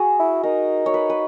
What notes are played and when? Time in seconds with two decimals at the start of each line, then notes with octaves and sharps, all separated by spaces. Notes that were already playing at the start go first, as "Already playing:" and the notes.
Already playing: F#4 G#4
0.19 E4
0.43 D#4 A#4
0.86 C#5
0.94 B4
1.10 B4